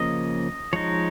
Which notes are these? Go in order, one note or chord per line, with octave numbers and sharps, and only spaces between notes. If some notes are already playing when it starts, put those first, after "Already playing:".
Already playing: C#3 F3 A#3 C#4 D#5
F3 G#3 D#4 C#5